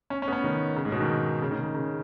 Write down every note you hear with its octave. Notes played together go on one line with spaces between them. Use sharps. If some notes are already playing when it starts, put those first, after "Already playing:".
C#4
C#4
B3
C#4
D#3
C#3
G#2
B2
D#3
C#3
D#3
C#3
C#3